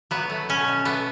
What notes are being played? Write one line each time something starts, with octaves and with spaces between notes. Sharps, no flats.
F#3 B3
A3
B2 C#4
B2
A3 B3